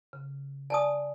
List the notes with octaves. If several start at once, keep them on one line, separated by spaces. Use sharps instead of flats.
C#3
D5 G#5 A5 D#6